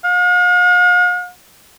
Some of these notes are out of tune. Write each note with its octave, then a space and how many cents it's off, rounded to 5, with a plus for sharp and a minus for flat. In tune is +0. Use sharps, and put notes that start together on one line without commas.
F5 +45